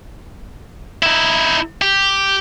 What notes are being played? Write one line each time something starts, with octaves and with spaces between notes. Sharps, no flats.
D#4 E4
G4